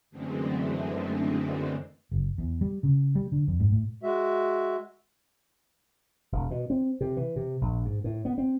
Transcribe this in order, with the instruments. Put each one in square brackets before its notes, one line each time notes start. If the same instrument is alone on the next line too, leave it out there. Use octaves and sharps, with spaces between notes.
[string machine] F#2 D3 E3 G#3 A3 C4
[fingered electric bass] F#1
E2
G3
C#3
G3
D3
F2
G#2
A2
[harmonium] G#3 F#4 E5
[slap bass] E1
B2
C4
C3
E3
C3
A#1
G#2
A2
B3
C4